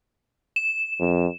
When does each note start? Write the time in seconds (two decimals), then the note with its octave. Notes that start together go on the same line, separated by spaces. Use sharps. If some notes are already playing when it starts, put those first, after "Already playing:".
0.56 E7
1.00 F2